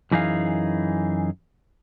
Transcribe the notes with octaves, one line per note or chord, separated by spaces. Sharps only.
F#2 E3 D#4 G#4 F5